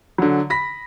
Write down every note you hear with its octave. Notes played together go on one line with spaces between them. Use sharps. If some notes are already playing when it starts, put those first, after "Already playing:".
D3 F#3
B5 A#6 B6